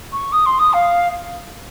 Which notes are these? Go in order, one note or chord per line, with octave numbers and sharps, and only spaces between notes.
C#6
D#6
C6
D#6
F5